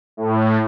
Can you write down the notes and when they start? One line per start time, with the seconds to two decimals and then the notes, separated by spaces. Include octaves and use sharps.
0.17 A2